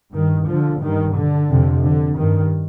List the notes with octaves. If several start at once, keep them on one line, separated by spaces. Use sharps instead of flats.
G2 D#3
D3 F3
G2 D#3
D3
F2 C3
D3
G2 D#3